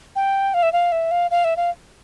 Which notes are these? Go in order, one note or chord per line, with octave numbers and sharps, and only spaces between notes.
G5
F5
E5
F5
E5
F5
F5
E5
F5